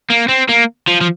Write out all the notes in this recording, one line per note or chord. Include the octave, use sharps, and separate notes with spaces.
A#3
C4
A#3
F3
F3